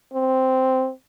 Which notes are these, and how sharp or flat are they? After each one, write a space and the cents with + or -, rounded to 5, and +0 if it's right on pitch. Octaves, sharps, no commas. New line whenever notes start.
C4 -5